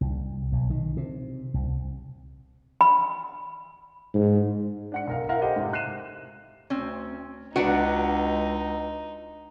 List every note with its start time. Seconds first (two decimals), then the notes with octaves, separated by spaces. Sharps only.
0.01 C2
0.52 B1
0.70 D#3
0.97 C3
1.54 C2
2.81 B5
4.14 G#2
4.92 D4 F#5 C#7
5.07 B1 A#4 F5
5.29 E4 A#4 F5 F#5
5.41 G4 A4 C5 D#5 F5 F#5
5.56 G#2 C3
5.73 F#6 C7 D#7 E7
6.70 D2 C4 C#4
7.56 C#2 D4 D#4 F#4 B4 F#5